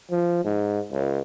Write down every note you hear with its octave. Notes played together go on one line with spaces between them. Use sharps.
F3
G#2
C#2